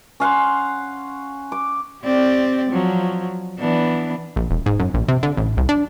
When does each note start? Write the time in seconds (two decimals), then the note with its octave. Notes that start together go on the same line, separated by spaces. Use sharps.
0.20 C#4 F5 F#5 C6
1.52 D6
2.04 C4 G4 D5
2.70 F3 F#3
3.59 E3 B3 D4
4.36 A#1
4.51 E1
4.66 G#2
4.80 F#2
4.94 A#1
5.08 C3
5.23 D3
5.37 A1
5.57 C2
5.69 D4